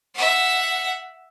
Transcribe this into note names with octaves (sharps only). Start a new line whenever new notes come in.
E5 F#5